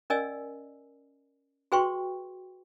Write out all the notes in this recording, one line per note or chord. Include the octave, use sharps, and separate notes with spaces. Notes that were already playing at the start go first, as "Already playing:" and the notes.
C#4 A#4 D5 D#5 G#5 E6
F#4 G#4 B4 G5 C6 C#6